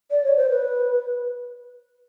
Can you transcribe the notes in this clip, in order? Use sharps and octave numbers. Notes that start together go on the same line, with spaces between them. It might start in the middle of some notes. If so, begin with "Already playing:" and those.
D5
C#5
C5
B4